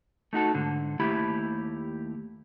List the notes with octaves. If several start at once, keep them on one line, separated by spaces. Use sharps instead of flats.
A3 D#4 F#4 A4
G#2 D3
D#2 A3 E4 G4 B5